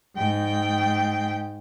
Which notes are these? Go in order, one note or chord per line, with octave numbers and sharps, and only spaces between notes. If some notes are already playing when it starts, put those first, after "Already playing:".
G#2 G5